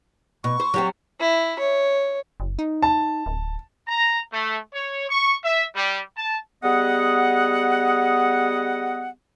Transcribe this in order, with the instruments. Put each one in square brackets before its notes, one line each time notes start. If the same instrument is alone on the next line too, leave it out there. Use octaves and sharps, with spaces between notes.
[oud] B2 [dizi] C#6
[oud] C5
F#3 G3 C4
[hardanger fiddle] E4
C#5
[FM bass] F#1
D#4
[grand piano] A5
[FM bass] D1
[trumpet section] A#5
A3
C#5
C#6
E5
G3
A5
[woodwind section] G3 B3 G#4 D#5 F#5